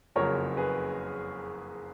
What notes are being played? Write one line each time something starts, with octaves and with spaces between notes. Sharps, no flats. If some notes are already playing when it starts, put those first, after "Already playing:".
F#1 F2 C#3 F#3 A#4 C#5
G#4 B4